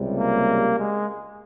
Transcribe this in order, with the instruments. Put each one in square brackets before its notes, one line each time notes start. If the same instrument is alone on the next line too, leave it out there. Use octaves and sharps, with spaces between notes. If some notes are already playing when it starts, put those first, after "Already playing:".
Already playing: [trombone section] C#2 C3 G3
A#3
G#3